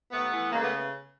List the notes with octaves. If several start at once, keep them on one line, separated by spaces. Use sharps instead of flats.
D#2 A3 B3
E3
C#3 G#3 A#3
A3 B3